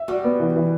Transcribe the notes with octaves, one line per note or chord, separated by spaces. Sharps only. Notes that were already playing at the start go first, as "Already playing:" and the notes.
Already playing: E5
G3 F#4
B3
E3
E3